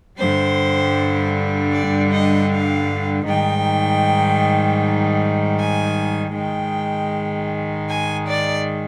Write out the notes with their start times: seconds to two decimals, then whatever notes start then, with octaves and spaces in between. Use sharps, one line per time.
0.19 G2 D3 G3 C5
1.73 D5
2.11 D#5
2.50 F5
3.27 G#2 D#3 G3 G5
5.58 G#5
6.35 G#2 D#3 G#3 G5
7.89 G#5
8.27 D5